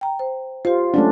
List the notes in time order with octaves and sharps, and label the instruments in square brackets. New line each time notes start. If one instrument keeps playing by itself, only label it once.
[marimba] G5 A#5
C5
[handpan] F4 [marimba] G4 C5
[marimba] F#3 G#3 [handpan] A3 C#4 D4